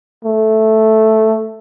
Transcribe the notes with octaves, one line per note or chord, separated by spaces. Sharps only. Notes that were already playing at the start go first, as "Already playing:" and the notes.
A3